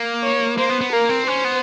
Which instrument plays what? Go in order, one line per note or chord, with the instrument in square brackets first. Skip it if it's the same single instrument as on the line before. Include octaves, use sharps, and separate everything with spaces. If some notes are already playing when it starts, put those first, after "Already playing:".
Already playing: [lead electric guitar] A#3
[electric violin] C#5
[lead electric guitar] A#3 [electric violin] C5
[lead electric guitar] B3
B3
[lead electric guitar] A#3 [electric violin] A#4
[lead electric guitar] C4
[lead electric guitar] C#4 [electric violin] C5
[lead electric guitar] B3